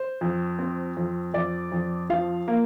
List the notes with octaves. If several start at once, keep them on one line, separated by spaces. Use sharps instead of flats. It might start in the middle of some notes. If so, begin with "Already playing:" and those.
Already playing: C5
F2
C4
F2
F2 D5
F2
F3 F5
A#3